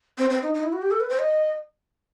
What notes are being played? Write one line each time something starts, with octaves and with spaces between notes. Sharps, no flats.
C4
C4
D#4
D#4
E4
F#4
G4
A4
B4
C5
D#5